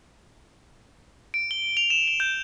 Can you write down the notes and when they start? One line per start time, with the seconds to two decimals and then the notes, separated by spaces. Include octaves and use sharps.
1.34 D7
1.51 G7
1.77 F7
1.90 E7
2.08 G7
2.20 G6